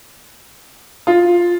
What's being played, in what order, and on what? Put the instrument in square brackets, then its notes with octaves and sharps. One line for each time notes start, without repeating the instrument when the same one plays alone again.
[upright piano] F4